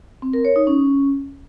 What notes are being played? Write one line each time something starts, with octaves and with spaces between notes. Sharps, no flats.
C4
A#4
C#5
D#4
C#4